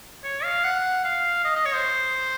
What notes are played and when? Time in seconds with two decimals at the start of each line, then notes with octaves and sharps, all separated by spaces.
0.24 C#5
0.43 F5
0.64 F#5
1.05 F5
1.44 D#5
1.56 D#5
1.65 C#5
1.75 C5